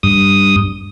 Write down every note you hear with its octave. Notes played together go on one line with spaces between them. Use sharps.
G2 D#6